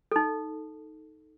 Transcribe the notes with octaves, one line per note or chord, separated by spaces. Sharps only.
D#4 A4